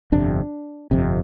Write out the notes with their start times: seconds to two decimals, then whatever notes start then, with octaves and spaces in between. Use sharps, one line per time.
0.12 G1 F2 C3 D4
0.91 G1 F2 C3